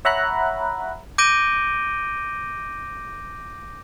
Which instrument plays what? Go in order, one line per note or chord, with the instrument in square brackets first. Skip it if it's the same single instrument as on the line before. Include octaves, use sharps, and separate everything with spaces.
[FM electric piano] C#5 E5 F#5 A#5 B5 F#6
[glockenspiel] D6 G6 A#6 D7 D#7 G7